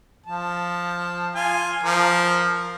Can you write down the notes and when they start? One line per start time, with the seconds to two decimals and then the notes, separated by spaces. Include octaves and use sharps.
0.26 F3 A5
1.35 F4 G#5
1.83 F3 A#4